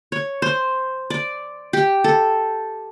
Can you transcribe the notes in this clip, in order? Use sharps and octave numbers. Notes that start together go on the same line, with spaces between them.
C#5
C5
D5
G4
A4